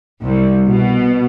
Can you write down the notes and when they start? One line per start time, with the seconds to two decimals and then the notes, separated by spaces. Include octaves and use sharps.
0.22 C2
0.67 B2